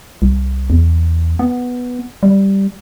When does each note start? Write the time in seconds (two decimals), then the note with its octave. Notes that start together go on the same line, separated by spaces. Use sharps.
0.22 C2
0.70 E2
1.39 B3
2.23 G3